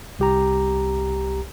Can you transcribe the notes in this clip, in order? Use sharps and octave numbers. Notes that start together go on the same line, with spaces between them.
C2 G4 A#5